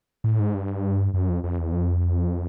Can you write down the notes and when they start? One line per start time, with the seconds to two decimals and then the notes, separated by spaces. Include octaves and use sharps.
0.24 A2
0.40 G#2
0.54 G2
1.14 F#2
1.29 F2
1.44 F2
1.58 E2
1.73 F2